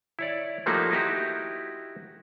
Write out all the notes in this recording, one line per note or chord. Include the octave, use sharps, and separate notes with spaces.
E4 C#5 D5
F3 G3 A3 A#3 D#4 F#4
D#4 E4 F#4 G4